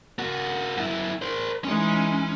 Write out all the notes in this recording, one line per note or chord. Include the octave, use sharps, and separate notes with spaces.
A#3 F#4
F#2 E4
A#4 C5
E3 G#3 C#4 D#4